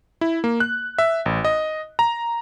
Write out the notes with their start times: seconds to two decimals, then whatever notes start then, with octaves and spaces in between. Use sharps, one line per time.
0.21 E4
0.44 A#3
0.60 F#6
0.98 E5
1.26 A1
1.45 D#5
1.99 A#5